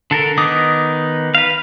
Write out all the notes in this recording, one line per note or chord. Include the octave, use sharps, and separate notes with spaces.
D3 A4 A#4
D#3 B3 D#4 D6 D#6
B4 F5